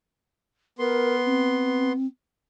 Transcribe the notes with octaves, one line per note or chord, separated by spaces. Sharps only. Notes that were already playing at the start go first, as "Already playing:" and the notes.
B3 A#4 C6
C4